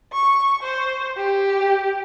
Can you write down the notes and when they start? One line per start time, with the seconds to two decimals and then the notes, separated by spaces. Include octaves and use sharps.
0.13 C#6
0.63 C5
1.17 G4